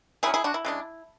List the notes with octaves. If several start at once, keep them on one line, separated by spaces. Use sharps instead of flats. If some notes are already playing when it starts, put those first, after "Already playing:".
C#3 F#3 C#4 E4 G#4
E4 G#4
D4 F#4
E4
C#3 G#3 D4